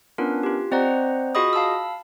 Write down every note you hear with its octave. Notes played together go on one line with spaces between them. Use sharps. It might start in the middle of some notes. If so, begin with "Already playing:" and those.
B3 C#4 D4 F4 A#4 B4
F4 G4
C4 C5 D5 D#5 F#5 A#5
F4 F#4 G#4 D#5 B5 D#6
F5 A5 B5 E6